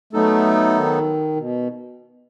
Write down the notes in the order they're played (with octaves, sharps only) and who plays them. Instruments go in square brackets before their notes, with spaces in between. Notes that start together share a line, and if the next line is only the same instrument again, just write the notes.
[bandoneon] F#3 B3 D#4 A4 [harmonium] A3
[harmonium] D#3
B2